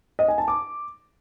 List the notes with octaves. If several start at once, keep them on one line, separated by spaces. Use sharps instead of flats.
D#5
G#5
A5
D6